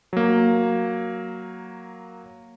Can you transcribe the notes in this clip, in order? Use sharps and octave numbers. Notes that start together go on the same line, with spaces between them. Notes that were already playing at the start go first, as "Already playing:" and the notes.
F#3 A#3